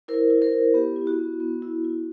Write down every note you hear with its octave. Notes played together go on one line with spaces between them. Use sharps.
E4 A#4 C5
E4
A#4 C5
E4
B3 G4
E4
F#4
B3
B3
E4
E4